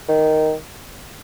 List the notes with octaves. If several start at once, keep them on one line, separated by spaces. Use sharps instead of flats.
D#3